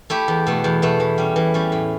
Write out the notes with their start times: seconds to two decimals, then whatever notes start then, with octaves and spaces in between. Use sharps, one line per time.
0.10 A3 E4 G4
0.28 E2
0.47 B2 A3
0.64 E2
0.82 B2 A3
1.00 E3
1.18 G3 C#4
1.36 E3
1.54 G3 C#4
1.72 A2